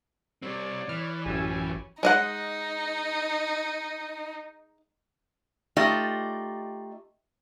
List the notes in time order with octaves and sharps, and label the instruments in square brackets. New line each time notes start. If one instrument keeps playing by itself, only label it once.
[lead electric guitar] G3 C4 [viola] C#5 D5
[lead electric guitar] E3 [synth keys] F6
[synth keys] A1 F#2 E6 [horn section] G3 G#5 [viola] C#5
[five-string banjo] G#3 D#5 F#5 [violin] D#4
[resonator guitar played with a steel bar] A3 D#4 F4 G4 D5 D#5